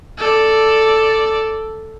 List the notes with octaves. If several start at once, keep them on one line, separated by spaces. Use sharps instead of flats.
A4 D5